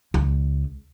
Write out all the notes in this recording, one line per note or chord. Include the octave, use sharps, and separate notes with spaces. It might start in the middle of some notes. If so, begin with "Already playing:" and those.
C#2